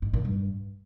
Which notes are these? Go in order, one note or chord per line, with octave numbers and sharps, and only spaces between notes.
G#2
A#2
G2